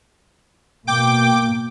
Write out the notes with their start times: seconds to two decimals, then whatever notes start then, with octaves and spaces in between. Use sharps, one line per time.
0.87 B2 A#3 G5 D6